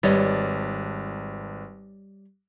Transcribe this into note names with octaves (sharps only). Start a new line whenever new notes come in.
G#1 G3 B4 C#5 D#5 A6